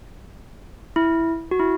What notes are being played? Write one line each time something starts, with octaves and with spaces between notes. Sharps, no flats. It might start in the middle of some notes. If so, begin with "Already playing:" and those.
E4
F#4
E4